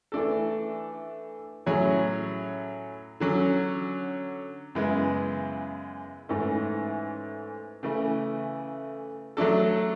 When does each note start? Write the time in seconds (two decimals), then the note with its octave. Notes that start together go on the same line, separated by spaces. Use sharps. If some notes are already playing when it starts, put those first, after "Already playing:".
0.12 E3 A3 D4 A4
1.66 A2 F#3 C#4 G#4 C#5
3.20 D3 F#3 C#4
4.75 F#2 C#3 E3 G#3 B3
6.29 G#2 E3 A3 C#4
7.83 C#3 E3 A3
9.37 F#3 A3 D4 A4